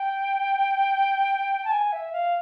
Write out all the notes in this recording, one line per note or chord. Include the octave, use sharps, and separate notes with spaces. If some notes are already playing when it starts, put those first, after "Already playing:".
Already playing: G5
A5
G#5
E5
F5